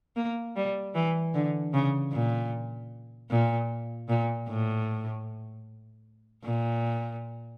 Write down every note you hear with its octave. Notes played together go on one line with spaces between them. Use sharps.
A#3
G3
E3
D3
C#3
A#2
A#2
A#2
A2
A#2